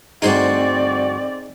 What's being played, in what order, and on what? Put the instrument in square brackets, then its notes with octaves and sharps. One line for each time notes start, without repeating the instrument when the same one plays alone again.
[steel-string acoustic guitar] D2 G2 F#4 [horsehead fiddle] C4 D5 [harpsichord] D#4 G#4 C5